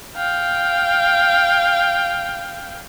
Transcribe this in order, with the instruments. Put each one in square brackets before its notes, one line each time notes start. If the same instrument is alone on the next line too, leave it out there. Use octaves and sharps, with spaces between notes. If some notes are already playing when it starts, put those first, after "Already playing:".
[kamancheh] F5 G5